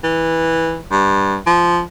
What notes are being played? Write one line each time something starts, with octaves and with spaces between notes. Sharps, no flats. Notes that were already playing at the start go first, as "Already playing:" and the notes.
E3
G2
F3